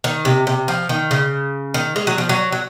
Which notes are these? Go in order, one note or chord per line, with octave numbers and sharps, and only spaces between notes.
D#3
C3
C3
F3
D#3
C#3
D#3
G#3
F#3
F3
F#3
F#3